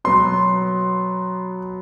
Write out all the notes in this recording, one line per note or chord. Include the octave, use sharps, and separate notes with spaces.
B2 F#3 B3 C6